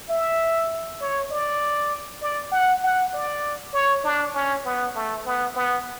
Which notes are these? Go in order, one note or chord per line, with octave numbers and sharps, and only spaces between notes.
E5
C#5
D5
D5
F#5
F#5
D5
C#5
D4
C#4
B3
A3
B3
B3